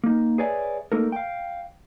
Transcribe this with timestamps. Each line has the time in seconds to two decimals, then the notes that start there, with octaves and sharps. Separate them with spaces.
0.04 A#3 D#4
0.38 G#4 B4 C#5 D5 E5 G#5
0.92 A3 A#3 D#4 A4 A#4
1.12 F5 G5